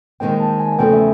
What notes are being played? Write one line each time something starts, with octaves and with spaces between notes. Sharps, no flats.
D#2 D#3 G#3 C4 G5
A5
G#5
G#5
E2 C#3 F3 A3 G5
E5